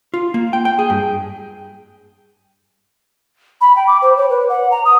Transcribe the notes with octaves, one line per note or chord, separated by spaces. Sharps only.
F4
A#3
G5
G5
G#4
G2
B5
G5
D6
C5
C#5
B4
F#5
A#5
D#6